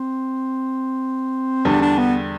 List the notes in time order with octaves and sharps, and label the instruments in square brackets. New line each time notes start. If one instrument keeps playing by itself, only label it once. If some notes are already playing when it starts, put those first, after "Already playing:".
Already playing: [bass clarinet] C4
[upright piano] E2 D3 G3 [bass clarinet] D4
[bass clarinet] D4
B3